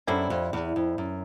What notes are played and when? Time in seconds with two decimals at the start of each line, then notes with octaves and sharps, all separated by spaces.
0.07 F#2 D3 G3 C4 E4
0.30 F2
0.53 E2
0.76 F2
0.98 F#2